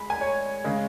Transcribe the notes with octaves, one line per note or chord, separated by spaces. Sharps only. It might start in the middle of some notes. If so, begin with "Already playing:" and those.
Already playing: G#3 B5
G#5
C#5
C#3 G#3